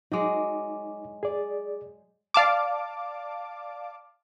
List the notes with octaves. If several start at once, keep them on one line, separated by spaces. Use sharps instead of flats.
F#3 G#3 D#4 D6
G#4 D5
D5 F5 A5 D6